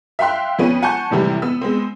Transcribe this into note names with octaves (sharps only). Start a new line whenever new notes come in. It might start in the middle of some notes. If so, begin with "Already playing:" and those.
E5 F5 G5 C6 F#6
F2 B3 C#4 D#7
F#5 G#5 A5 C#6 G6
F1 A2 C3 E3 G3
B3 E6
G#3 B3 C4